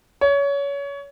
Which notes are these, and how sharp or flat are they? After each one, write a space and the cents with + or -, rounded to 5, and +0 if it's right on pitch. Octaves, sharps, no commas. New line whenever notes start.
C#5 +25